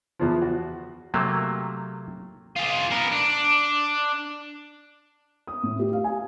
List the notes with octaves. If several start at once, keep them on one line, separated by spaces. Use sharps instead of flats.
E2 F3
F#4
C3 F#3 A3 A#3
F4 G#4
B3 A#4
D4
D#6
A2
G4
F5
G#5